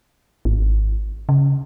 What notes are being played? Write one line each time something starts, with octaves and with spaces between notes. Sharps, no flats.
G#1
C#3